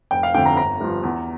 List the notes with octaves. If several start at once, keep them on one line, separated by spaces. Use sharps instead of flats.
F1 G5
F5
F2 D3 G5
A#5
G1 A#5
G2 F3
E2